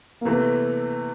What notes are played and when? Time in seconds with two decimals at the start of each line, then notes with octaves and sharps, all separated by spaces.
0.21 A#3
0.25 C3 E3 A3 B3